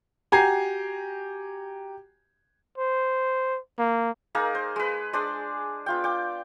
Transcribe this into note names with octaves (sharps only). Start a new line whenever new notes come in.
F#4 G4 G#5 A#5 G#6 C7
C5
A#3
A#3 D#4 G#4 A#4
C5
G#3 B4
G#3 D4 C5 D5
B3 F4 G5
G5 D6